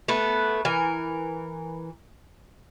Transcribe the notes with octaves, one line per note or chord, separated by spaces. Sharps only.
A3 B3 B4
E3 A#4